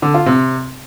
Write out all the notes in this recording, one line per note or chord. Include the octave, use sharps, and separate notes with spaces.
D3
F4
C3